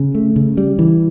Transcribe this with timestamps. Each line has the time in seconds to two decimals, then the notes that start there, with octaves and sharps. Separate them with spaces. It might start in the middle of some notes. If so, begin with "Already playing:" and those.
Already playing: C#3
0.15 A3
0.36 C#3
0.57 G3
0.79 E3